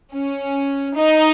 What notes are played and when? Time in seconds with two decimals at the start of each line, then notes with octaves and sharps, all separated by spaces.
0.15 C#4
0.96 D#4